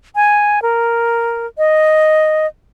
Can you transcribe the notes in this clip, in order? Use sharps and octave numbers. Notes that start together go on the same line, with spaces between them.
G#5
A#4
D#5